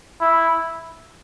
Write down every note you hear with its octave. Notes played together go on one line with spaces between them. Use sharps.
E4